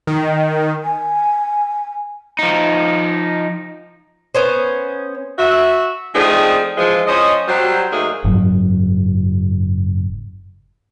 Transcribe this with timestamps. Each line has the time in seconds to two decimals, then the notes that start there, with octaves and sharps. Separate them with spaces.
0.07 D#3
0.83 G#5
2.39 F3 D#4
4.35 B3 C#4 C5
5.38 F#4 E5
6.15 F3 A3 C4 D4 D#4 G#4
6.77 E3 F3 G#3
7.07 F3 C#4 C5 C#5 D#5
7.48 F#3 G3 C5
7.92 G#2 F#3 A3 A#3 D#4 G#4
8.24 F#1 G#2 F#3